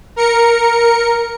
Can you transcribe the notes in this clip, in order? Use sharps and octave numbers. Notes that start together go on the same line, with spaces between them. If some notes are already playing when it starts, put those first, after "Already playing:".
A#4 C#7